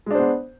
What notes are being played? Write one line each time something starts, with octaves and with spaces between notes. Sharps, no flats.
G#3 B3 D4 C5